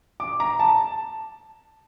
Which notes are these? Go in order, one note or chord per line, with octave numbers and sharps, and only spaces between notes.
D6
A#5
A5